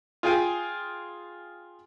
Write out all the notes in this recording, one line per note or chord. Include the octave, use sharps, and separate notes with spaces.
F4 G#4 F5 G5 G#5